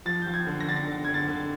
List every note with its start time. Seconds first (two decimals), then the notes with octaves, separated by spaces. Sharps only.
0.06 F3 A6
0.22 F3 G6
0.34 G#6
0.47 D3
0.60 A#6
0.67 D3 A6
0.76 A#6
0.87 D3
1.05 D3 G#6
1.14 A6
1.28 D3